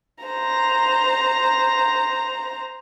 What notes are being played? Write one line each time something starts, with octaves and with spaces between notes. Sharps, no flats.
C5 A#5